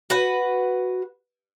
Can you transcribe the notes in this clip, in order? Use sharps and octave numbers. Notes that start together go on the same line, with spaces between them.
F#4 B4 F#5